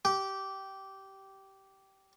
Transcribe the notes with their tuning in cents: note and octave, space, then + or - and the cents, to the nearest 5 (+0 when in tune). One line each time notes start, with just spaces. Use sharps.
G4 -15